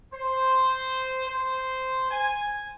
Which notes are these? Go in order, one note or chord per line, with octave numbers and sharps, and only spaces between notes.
C5
C5
G#5